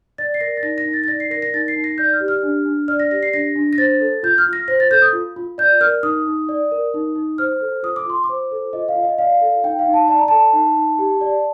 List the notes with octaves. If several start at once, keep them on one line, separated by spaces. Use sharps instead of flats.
D5 A6
C7
A#4 A#6
A6
D#4 A#6
A#6
D#4
A6
A6
D5 A#6
C7
A#4 A#6
A#6
D#4 A6
C7
D#4
A#6
D5 G6
F6
G4
F6
D4
D4
D5 F6
A#6
G4 A#6
C7
D4 A#6
D4
A#6
C5 A6
A4
F4 G6
F6
F4
A#6
C5 A#6
A6
A4 G6
D#6
F4
F4
D5 G6
A#4 F6
D#4 D#6
D#4
D5
A#4
D#4
D#4
C5 F6
A4
F4 D#6
D6
F4 C6
D6
C5
A4
F4 D#5
F5
F4
D#5
D5 F5
A4
D#4 G5
F5
D#4
A5
D5 A5
A#5
A4 A5
D#4
D#4
G4
D5